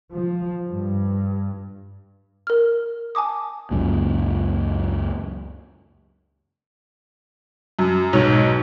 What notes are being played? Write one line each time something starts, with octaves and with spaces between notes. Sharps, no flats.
F3
G2
A#4 F6
G#5 A5 D6 D#6
C#2 F#2 A#2
F#2
B1 G#2 C#5